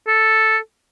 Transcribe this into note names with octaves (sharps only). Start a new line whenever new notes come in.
A4